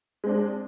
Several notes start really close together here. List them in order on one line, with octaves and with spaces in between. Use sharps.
G#3 C4 D4